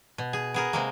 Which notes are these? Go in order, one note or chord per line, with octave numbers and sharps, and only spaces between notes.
B2
G#4
B3 G#4 A#4
C3 G#3 A#3